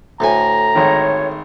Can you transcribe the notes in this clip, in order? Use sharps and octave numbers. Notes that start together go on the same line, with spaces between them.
D2 A2 G#5 A#5
G#1 D#3 C#5